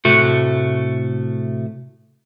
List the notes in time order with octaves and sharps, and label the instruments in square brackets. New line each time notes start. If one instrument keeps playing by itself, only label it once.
[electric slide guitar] A2 C3 A3 F#4